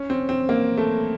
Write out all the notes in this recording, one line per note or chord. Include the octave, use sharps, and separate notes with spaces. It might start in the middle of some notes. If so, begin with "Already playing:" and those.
Already playing: C#4
C4
C4
A#3
A3